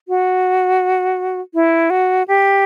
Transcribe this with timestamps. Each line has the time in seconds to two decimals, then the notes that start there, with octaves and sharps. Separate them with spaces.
0.08 F#4
1.54 E4
1.90 F#4
2.28 G4